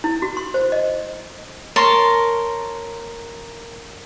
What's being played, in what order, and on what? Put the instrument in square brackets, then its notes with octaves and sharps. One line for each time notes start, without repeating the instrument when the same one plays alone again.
[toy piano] E4
F#4
C6
C5
D#5
[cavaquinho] A#4 C#5 A5 C6